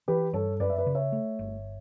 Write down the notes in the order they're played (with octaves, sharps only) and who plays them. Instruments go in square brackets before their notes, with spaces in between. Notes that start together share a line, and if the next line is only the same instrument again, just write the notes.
[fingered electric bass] E3 [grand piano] G4 B4
[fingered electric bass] G2 [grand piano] A4 C#5
[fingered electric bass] F#2 [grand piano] B4 D5
[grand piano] E5
B4 D5
[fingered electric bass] C#3
[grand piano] C#5 E5
[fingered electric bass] A3
G1